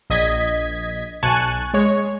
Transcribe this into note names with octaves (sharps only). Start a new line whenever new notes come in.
A#1 D#5 G#6 B6
B1 G#5 A5 C#6 F#6
G#3 C#5